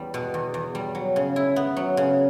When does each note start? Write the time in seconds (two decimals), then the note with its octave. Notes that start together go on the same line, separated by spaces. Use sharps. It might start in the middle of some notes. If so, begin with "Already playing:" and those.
Already playing: E2 G3
0.14 B2
0.34 E2
0.54 E2
0.75 G3
0.95 F#3
1.16 C#3
1.36 E4
1.56 B3
1.77 F#3
1.97 C#3